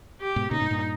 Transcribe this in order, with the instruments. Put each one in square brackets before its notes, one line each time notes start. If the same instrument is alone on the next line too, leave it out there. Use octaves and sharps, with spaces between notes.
[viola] G4
[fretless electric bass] G#2 B2
[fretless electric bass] A#2 C#3 [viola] D#4
[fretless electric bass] G#2 B2
G2 A#2